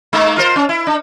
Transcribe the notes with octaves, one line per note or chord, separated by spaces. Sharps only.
G#3 A#3 D#4
F4 A#4 C5
C#4
E4
D4